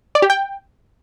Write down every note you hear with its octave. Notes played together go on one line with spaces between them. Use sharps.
D5
G4
G5